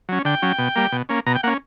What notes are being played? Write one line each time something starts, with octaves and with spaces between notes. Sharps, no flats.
F#3 C#4
D3 G5
F#3 C#4
B2
G3 A#3
B2
A#3 C#4
B2 A#5
G5
A#3 C#4 F#5